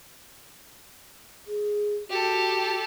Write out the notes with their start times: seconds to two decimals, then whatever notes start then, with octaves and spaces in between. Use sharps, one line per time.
1.47 G#4
2.10 F#4 G4 A4